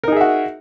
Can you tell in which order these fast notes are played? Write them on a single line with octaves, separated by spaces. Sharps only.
A#4 D#4 G#4 E5 F#4